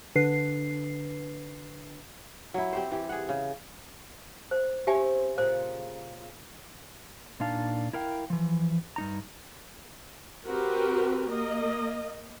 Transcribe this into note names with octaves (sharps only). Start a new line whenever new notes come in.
D3 D4 B4 C7
F#3 E4
C4 G4 C5
E3 G4
G#4 F#5
C#3
C5
C4 C#4 G4 C#5 E5 G#5
A#2 C#3 C5
A#2 D4 D#4 F5 A5
E4 A#4 F5 G5
E3 F3
G2 D#4 A#5
C4 F#4 G4 A#4 B4
A#3 D#5